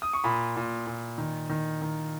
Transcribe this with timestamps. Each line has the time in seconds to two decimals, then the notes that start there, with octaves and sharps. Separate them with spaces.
0.02 D#6
0.13 C#6
0.24 A#2 B5
0.56 A#2
0.87 A#2
1.18 D#3
1.49 D#3
1.82 D#3